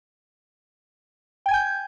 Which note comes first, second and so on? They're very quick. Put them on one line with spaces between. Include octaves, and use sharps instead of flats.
G5 G#6 G#5 G6